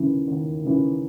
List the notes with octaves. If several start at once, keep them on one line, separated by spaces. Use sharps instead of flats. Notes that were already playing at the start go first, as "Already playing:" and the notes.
Already playing: D#2 C#3 E3
D#2
C#3 E3